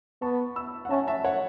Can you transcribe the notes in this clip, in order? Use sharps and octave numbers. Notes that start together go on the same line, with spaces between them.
B3 A5 C#6
B5 E6
F#5
C#4 E5 A5
E5 A5
C#5 F#5